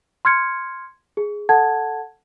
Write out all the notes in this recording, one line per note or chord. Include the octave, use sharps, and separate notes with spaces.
C6 F6 G#6 C#7
G#4
A4 F#5 A5 G#6